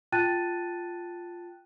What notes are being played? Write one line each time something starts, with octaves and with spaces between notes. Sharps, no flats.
F4 G5 A5 F#6 A6 D#7